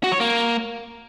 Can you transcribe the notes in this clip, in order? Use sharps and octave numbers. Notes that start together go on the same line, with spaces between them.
F#4
C#5
A#3